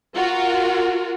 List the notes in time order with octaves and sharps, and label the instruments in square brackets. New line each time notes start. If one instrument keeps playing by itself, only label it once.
[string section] F4 F#4 A#4